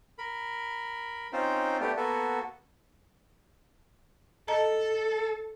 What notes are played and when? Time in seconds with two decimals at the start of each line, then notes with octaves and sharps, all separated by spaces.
0.18 A#4 B5
1.33 C4 C#4 D#4 F4 C5
1.81 A3 B3 D4 G4
1.97 A#3 B3 F#4 A4
4.48 A4 D#5 A5 A#5